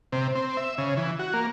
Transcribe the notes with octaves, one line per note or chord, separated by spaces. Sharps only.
C3
C4
E5
C#3
E3
F#4
A#3